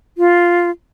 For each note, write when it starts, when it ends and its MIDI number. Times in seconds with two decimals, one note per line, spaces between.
0.18 0.70 65